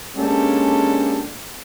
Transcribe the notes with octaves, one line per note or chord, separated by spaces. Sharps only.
G#3 A#3 C#4 D4 G4 A4